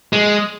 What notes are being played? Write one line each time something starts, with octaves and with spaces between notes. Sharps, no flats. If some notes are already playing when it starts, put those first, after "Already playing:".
G#3